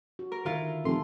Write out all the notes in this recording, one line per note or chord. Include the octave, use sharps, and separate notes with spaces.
F#4
A#4
D3 D#3 E4 F4 A#4
F1 A#2 A4 C6